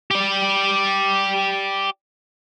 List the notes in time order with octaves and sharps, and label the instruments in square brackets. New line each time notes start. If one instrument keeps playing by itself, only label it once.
[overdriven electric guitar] G4 D5